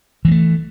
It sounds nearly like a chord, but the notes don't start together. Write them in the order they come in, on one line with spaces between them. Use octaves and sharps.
E3 G#3 A3